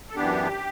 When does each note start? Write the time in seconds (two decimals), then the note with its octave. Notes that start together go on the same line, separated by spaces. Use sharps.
0.10 A4
0.16 F#2 E3 B3 D4 G4